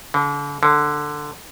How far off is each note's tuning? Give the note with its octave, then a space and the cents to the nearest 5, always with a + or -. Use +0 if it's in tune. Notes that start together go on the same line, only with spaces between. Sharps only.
D3 -40
D3 +10